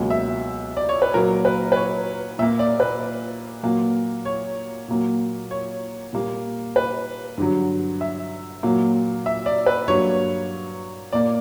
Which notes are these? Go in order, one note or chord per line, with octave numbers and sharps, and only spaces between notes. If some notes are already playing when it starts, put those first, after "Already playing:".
Already playing: C#2 B2 F#3 A#3
E5
D5
C#5
B4
A#2 F#3 A#3 A#4
B4
B4
C#5
A#2 A#3 E5
D5
B4
A#2 F#3 A#3
C#5
A#2 F#3 A#3
C#5
A#2 G3 A#3
B4
G2 D3 F#3
E5
A#2 F#3 A#3
E5
D5
B4
G2 F#3 A#3 C#5
A#2 A#3 D5